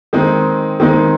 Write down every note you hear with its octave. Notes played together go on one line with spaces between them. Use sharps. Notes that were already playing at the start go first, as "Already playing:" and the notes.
D#3 G#3 C4 D#4
D#3 G#3 C4 D#4